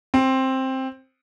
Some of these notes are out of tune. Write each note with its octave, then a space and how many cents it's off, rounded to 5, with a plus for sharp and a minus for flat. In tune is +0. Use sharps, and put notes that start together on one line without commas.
C4 +10